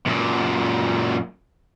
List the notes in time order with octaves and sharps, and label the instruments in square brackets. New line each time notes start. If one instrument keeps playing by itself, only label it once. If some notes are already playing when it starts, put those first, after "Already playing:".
[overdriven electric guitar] F#2 A#2